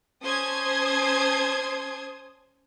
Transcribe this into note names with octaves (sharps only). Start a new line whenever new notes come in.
C#4 C5 A5 C6 D#6 G#6